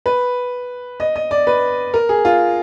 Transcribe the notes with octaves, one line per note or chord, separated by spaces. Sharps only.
B4
D#5
D#5
D5
B4
A#4
G#4
F4